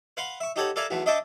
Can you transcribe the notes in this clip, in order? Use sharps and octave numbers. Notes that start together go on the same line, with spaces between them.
B4 F5 F#5 C6
E5 C#6
D#4 G4 A4 C#5 F#5 B5
A4 A#4 D5 E5 F5 G#5
B1 E2 A3 B3
D4 D#5 E5 G5 A5 C#6